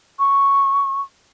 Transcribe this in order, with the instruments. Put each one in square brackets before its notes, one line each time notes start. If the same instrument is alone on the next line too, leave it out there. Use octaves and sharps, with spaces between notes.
[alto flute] C#6